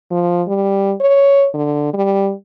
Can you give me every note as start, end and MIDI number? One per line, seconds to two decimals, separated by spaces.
0.11 0.43 53
0.48 0.93 55
1.01 1.47 73
1.54 1.92 50
1.94 2.33 55